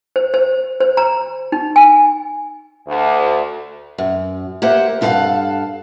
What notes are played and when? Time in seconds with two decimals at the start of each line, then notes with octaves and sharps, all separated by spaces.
0.16 C5
0.34 C5
0.80 C5
0.97 A#5
1.52 D#4
1.76 G#5
2.88 D2
3.98 F#2
4.62 A#3 G4 C5 E5 F#5
5.01 G2 F4 A4 B4 F5 F#5